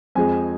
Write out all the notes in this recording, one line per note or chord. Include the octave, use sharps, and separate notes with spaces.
F2 F3 G#3 G#5